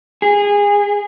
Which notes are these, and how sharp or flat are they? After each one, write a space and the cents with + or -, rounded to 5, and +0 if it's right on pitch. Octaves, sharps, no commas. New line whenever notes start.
G#4 -25